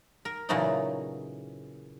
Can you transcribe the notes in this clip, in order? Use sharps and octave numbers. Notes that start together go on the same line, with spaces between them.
A#4
A#2 C#3 E3 F#3 A3 D#4